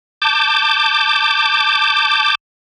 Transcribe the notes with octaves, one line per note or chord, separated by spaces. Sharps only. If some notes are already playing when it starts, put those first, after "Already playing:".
A5 D6 G6